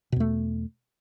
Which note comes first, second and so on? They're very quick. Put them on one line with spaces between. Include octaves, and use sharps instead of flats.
B2 E2 A3